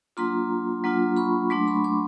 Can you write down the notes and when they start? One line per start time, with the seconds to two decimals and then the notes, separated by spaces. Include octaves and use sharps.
0.17 F#3 A#3 D4 F4 A#5 C6
0.84 F#3 A#3 D4 F4
1.17 B5 C#6
1.50 F#3 A3 D4 C6 D6
1.68 B5 C#6
1.84 C6 D6